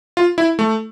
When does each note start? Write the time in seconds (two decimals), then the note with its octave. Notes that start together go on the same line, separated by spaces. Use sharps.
0.17 F4
0.38 E4
0.59 A3